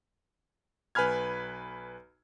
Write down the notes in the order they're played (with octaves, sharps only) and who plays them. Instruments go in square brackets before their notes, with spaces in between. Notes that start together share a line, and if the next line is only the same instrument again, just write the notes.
[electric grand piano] B1 B4 G#5 B5 F6 G#6